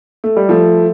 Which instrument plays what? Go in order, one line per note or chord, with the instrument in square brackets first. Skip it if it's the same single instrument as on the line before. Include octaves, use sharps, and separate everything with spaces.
[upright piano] A3
G3
F3 A3